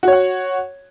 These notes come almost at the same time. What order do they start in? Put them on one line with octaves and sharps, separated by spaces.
F#4 C#5 F#5